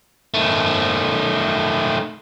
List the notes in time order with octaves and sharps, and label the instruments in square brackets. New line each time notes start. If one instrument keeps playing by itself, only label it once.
[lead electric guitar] D#3 A3